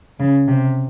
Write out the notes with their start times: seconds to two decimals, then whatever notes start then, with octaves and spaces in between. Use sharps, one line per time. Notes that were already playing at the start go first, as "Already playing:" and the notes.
0.18 C#3
0.47 C3